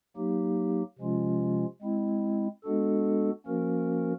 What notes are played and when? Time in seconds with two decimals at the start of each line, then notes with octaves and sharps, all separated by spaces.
0.16 F#3 A#3 D#4 G4
0.99 C3 F3 G#3 C#4 F4
1.82 G#3 C4 E4
2.64 G#3 B3 D4 F#4 A4
3.46 F3 A#3 C#4 F#4 A#4